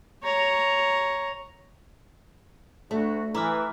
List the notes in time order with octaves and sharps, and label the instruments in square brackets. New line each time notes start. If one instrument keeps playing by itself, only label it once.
[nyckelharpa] C#5 A#5
[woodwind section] D2 D4 F#4 [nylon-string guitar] A3
[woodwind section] E3 [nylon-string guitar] E4 [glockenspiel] A#5 D6 F6